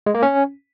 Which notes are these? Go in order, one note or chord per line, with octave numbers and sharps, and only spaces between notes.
G#3
A#3
C#4